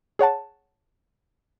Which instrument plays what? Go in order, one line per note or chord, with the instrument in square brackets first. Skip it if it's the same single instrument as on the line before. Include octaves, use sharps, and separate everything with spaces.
[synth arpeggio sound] G#4 C#5 F#5 A5